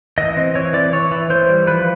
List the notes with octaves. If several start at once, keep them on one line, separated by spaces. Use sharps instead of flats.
E3 D#5
C4
E3 C#5
E3 D5
E3 C#5
E3
E3 C5
G3
F3 B4